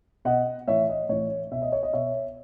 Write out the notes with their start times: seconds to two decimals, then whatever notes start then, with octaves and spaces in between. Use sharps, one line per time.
0.25 B2 D#5 F#5
0.67 A2 E3 C#5 E5
0.89 D#5
1.09 A2 E3 C#5
1.51 B2 E5
1.62 D#5
1.72 C#5
1.83 D#5
1.93 B2 C#5 E5